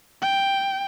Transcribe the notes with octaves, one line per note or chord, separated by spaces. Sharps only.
G5